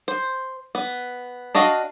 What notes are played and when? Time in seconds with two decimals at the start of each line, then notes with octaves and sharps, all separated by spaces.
0.08 C5
0.75 B3
1.55 D4 F#4 D#5 F5